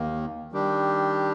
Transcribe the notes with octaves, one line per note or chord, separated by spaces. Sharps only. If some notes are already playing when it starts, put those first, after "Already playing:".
Already playing: D#2 D#3 A#3
D#3 G3 D4 G4